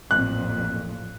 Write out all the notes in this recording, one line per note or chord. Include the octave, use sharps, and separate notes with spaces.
A1 F2 A#2 F#6